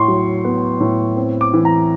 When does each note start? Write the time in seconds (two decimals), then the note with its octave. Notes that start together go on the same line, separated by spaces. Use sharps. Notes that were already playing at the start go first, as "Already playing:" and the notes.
Already playing: A2 C6 C#6
0.08 F#3
0.45 B3
0.80 A2
1.17 C4
1.41 D6
1.54 E3
1.65 A#5